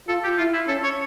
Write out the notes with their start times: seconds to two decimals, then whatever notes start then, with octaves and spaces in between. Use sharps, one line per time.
0.08 F4 A4
0.24 G4
0.38 E4 F4
0.53 E4
0.68 C#4 A4
0.83 C#5